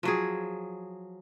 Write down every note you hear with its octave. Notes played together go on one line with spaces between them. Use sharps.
F3 F#3 G#4